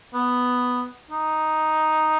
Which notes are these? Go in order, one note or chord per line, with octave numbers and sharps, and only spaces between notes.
B3
D#4